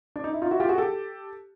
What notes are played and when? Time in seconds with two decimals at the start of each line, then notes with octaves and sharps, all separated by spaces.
0.16 D4
0.24 D#4
0.33 E4
0.42 D#4 F4
0.51 E4 F#4
0.60 F4 G4
0.68 F#4 G#4
0.78 G4 A4